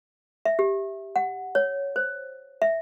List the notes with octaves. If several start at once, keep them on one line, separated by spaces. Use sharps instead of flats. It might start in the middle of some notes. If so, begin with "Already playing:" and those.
E5
G4
F#5
C#5
C5
E5